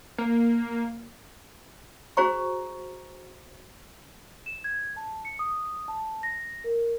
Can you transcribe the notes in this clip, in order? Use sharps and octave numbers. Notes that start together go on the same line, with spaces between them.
A#3
F#4 G#4 C5 A#5 C#6
E7
G#6
A5
C#7
D#6
A5
A#6
A#4